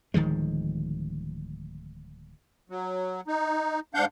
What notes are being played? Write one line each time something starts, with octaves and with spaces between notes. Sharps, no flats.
D1 D#3 F3 G#3
F#3
D#4
G#2 D4 F5 F#5 G6